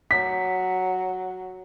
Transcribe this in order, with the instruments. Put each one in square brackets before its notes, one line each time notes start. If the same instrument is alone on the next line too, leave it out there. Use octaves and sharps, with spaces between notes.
[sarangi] F#3 [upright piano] B6